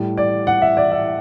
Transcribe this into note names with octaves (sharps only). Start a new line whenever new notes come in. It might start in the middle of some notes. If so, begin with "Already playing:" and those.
Already playing: A2 G3
D5
F#5
E5
D5
E5